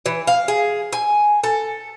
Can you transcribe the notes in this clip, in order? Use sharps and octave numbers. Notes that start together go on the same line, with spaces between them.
E3
F5
G#4
G#5
A4